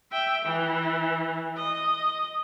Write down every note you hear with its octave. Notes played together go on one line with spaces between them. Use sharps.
E5 G5
E3
D#5